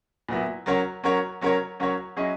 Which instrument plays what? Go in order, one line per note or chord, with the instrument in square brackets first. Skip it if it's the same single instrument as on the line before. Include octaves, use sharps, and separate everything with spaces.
[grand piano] A#2 F#3 B3 E4
F#3 C#4 F#4 A#4 C#5
F#3 C#4 F#4 A#4 C#5
F#3 C#4 F#4 A#4 C#5
F#3 C#4 F#4 A#4 C#5
F#3 C#4 E4 G#4 D#5